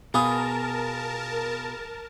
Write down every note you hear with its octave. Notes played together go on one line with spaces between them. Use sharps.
B2 F4 G#4 A#4 A5 B5 D#6